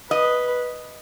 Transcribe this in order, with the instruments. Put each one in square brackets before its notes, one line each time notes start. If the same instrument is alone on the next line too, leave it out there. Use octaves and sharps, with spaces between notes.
[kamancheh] B4 [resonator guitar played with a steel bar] D#5